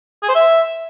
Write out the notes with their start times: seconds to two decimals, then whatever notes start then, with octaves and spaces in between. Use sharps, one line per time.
0.23 G#4
0.29 C5
0.35 E5